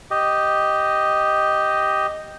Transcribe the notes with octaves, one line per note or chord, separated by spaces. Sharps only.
G4 D#5